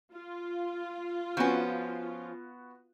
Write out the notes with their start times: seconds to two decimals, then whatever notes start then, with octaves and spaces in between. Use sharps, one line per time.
0.13 F4
1.37 F3 B3 C#4 F#4